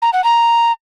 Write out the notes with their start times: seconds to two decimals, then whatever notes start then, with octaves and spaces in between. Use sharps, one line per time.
0.02 A#5
0.13 F#5
0.24 A#5